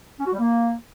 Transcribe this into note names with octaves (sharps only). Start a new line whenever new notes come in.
C#4
F#4
G3
A#3